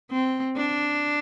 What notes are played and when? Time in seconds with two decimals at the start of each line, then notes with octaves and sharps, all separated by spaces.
0.12 C4
0.57 D4